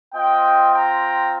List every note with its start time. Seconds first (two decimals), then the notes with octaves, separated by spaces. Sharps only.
0.14 C4 F4 D#5 G5
0.75 G5 A#5